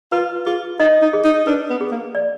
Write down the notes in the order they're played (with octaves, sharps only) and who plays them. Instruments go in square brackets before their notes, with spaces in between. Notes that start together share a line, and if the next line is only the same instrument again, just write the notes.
[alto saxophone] F4 [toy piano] B4
[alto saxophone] F4 [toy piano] G#4
[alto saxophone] D#4 [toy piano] D#5
[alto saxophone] D#4
[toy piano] G#4
[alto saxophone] D#4
[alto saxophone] D4 [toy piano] B4
[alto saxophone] B3
[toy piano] G#4
[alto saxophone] A#3
[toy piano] D5